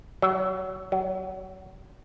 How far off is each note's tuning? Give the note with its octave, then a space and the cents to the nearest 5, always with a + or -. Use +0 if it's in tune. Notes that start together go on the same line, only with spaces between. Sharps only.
F#3 +25
F#3 +25